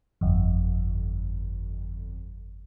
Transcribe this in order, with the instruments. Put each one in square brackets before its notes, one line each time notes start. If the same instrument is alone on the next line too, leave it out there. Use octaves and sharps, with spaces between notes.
[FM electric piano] G1 F2